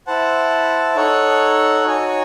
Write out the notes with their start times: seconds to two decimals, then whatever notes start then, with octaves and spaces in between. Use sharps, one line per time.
0.07 E4 C5 F#5 A5
0.96 D#4 A4 C#5 F#5
1.85 D#4 F#4 C#5 G#5